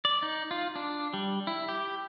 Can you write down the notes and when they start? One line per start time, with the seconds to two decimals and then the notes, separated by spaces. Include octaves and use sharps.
0.05 D5
0.22 D#4
0.51 F4
0.76 D4
1.14 G3
1.47 E4
1.69 G4